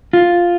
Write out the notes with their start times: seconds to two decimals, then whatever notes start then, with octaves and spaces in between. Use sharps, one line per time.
0.13 F4